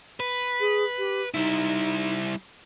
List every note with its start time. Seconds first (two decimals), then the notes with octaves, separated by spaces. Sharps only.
0.20 B4
0.60 G#4
0.98 G4
1.34 G3 D#4 E4